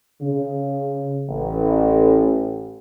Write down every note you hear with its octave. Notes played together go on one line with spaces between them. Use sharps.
C#3
A1